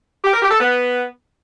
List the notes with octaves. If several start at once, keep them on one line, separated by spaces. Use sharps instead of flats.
G4
A#4
G4
A4
B3